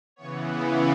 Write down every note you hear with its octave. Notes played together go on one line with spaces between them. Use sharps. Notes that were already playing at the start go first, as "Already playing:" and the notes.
C#3 E3 B3 C#5
B4